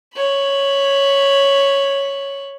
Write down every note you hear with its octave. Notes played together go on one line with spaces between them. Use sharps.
C#5 B5